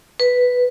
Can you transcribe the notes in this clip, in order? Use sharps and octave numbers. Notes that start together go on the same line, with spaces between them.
B4